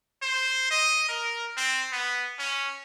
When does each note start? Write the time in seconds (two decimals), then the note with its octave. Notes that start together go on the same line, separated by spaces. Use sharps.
0.22 C5
0.71 D#5
1.09 A#4
1.57 C4
1.92 B3
2.39 C#4